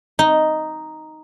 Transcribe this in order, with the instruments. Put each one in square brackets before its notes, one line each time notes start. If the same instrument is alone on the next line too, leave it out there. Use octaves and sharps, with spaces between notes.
[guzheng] D#4